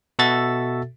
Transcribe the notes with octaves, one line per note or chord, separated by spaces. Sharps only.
B2 F#4 A4 E5 A6